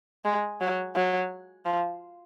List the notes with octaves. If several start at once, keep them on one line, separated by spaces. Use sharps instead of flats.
G#3
F#3
F#3
F3